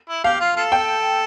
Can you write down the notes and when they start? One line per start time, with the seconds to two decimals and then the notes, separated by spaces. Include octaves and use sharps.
0.09 E4
0.24 G4 F5
0.41 F4
0.57 F4 A4
0.72 G5